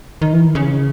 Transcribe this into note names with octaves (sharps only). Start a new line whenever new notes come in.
D#3
E3
C#3